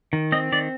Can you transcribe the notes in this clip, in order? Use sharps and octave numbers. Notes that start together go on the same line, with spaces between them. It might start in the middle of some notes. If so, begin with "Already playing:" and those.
D#3
C4 D#5
D#3 D5